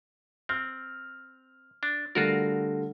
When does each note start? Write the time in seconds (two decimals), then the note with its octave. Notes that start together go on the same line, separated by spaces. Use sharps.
0.49 C4 F6
1.83 D4
2.15 D3 G3 A3 F4 F#4 A#4